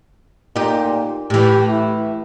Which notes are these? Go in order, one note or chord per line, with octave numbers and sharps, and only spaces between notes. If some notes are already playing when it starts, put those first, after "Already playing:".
A#2 D#4 G4
A2 E3 G4
E4